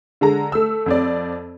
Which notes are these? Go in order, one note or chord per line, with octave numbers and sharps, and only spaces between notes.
D3 G#3 A#5
A3 E6
F2 C4 D5